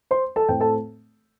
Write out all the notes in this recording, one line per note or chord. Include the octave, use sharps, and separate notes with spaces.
C5 C6
A4 A5
A2 A3 C4 G5
A4 A5